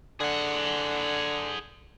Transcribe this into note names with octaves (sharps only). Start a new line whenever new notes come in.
D3 G#4 F#5